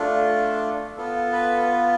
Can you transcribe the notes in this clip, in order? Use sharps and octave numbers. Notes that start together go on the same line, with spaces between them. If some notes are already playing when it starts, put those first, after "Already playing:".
Already playing: A3 D4 F4 A4
B3 F4 A4
B4